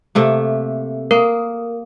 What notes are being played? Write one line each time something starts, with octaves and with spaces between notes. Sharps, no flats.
C3 A3 A#3
A#3 A#4